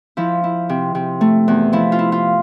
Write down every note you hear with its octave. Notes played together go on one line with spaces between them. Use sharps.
F3 E4
E4
C3
C3
A3
E2
F3 E4
F4
E4
F4